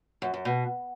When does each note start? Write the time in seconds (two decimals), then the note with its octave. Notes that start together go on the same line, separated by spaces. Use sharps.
0.22 F#2
0.34 F#2
0.45 B2